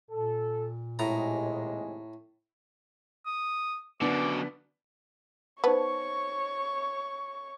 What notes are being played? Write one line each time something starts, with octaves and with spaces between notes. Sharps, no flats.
A#2 A4
D#2 A2 C3 G#3 A#5
D#6
F#2 B2 D3 B3 D4 D6
B3 D#4 C5 C#5 A5 C#6